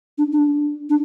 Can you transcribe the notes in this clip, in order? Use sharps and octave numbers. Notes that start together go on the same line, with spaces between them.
D4
D4
D4